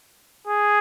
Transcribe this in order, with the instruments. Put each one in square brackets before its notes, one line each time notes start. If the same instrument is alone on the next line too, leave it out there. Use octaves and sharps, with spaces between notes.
[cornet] G#4